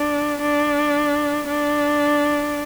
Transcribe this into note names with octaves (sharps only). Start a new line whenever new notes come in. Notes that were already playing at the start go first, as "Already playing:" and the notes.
Already playing: D4
D4
D4